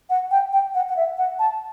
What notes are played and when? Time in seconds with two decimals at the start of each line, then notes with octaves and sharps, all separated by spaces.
0.10 F#5
0.31 G5
0.53 G5
0.75 F#5
0.89 F#5
0.96 E5
1.18 F#5
1.39 A5